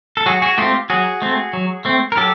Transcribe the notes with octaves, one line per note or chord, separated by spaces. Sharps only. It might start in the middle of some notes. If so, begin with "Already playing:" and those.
A4
F#3 F#4 G#4
F#4 G#4
A3 C4 F4 G4
F#3 F#4 G#4
A3 C4
F#3
A3 C4
A#4
F#3 G4 A4